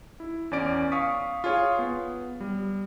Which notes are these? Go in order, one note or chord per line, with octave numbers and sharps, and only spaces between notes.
E4
E2 C#4 D5 D7
F5 C#6 D#6 B6
F4 G#4 C#5
B3
G3